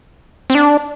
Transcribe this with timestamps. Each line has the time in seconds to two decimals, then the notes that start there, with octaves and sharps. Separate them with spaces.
0.50 C4
0.55 D4